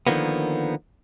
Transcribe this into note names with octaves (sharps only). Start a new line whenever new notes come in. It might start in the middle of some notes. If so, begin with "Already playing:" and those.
D3 D#3 F3 A#3 B3